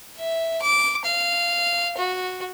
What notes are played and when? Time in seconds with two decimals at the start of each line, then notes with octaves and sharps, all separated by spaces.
0.17 E5
0.62 D6
1.05 F5
1.98 F#4